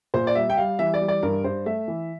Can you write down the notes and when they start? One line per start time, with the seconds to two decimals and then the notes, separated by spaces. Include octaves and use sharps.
0.14 A#2 C5
0.27 D5
0.35 G3 E5
0.50 G5
0.58 G3 F5
0.79 E3 E5
0.94 D5
1.01 G3
1.08 D5
1.23 G2 A#4
1.44 G2 C5
1.66 A3 E5
1.88 E3